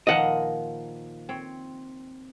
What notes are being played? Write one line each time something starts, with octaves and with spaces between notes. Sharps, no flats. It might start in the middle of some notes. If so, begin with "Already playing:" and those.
A#2 D#3 F3 D#5 F#5
C4 C#5